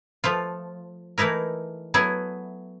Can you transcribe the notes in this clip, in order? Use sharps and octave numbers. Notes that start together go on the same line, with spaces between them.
F3 A3 F4
E3 A3 D#4 E4 A#4
F#3 A3 B3 E4 G#4